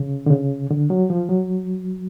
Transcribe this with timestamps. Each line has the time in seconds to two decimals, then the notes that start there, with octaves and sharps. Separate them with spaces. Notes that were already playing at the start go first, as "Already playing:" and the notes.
Already playing: C#3
0.26 D3
0.31 C#3
0.71 D3
0.90 F#3
1.10 F3
1.29 F#3